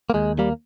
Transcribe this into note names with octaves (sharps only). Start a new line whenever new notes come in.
A#3
D#2 G#3
G3 A#3